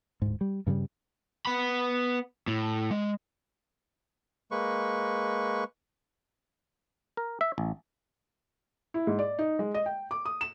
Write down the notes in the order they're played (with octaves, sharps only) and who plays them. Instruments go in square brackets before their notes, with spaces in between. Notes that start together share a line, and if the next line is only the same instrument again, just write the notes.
[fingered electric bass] D1 G#2
G3
G2 C#3 F#3 G3
[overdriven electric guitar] B3 B5
A2
G#3
[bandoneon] G#3 A#3 B4 C#6
[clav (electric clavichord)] A#4
E5
A1
[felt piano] E4
G#2
D5
D#4
G#3
D#5
G5
D6
D#6
E7